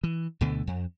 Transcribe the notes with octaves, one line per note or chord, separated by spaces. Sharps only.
E3
D2 B2 D3 A3
F2